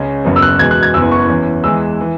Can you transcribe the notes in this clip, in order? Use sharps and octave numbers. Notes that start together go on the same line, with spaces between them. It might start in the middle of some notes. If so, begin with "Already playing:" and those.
Already playing: C#2 C#3 G#3 C#4
F#1 F#2 F#3 B3
E6
F#6
E2 B2 G#3 G#6
F#6
G#6
F#1 E2 E3 B3 E6
C#6
E2 E3 C#4
E2 E3 G#3 E6
E3